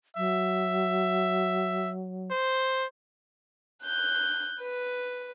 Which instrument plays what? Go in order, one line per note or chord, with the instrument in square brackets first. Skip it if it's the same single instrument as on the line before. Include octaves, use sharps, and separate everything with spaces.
[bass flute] F#3 [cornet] E5
[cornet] C5
[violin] F#6 G6
B4